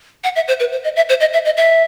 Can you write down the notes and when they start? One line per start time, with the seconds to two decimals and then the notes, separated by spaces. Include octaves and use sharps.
0.24 F#5
0.36 E5
0.48 C5
0.60 B4
0.72 C5
0.84 D#5
0.96 E5
1.09 C5
1.21 D#5
1.33 E5
1.45 D#5
1.57 E5